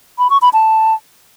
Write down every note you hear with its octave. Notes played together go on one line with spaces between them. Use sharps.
B5
C#6
B5
A5